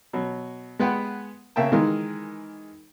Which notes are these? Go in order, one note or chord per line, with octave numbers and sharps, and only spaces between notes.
B2 F#3
G#3 B3 B4 F#5 G5
C#3 A#3 E5 G5 A5
D#3 E3 G#3 A#4